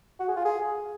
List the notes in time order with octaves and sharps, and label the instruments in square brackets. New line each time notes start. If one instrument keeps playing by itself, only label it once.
[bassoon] F#4
G#4
F4
G#4